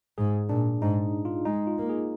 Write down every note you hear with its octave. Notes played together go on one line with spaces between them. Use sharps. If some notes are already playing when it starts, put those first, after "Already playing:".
G#2 G#4
A#2 D4
G#2 D#4
F4
G#3 D#4
F4
A#3
G#4